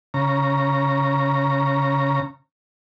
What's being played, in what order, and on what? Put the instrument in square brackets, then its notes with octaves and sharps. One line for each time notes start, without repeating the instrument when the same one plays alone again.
[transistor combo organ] C#3 A#5